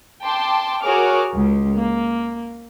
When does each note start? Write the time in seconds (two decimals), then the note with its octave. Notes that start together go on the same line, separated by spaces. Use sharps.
0.23 G5 A5 C6 D6
0.83 F#4 G#4 A#4 C#5 D6 F6
1.35 C#2
1.76 A#3